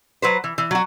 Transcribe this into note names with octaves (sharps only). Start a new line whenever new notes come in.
F#3 B4 C5
E3
E3
F#3 F#4